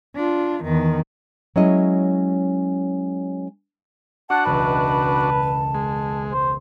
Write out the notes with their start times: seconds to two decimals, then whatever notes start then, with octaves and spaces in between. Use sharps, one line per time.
0.16 D4 F4
0.64 E2 D#3
1.56 F#3 G#3 C#4 E4 D#5
4.30 D4 F#4 F#5 A5
4.46 E1 C#2 B4
5.75 G#3
6.32 C5